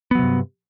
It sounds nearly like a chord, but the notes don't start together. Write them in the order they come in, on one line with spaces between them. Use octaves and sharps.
B3 F#3 C3 G2